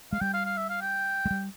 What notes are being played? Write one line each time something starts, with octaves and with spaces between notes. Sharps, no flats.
G#3 F5
G3 G5
F5
F5
E5
F5
G5
G#3
G3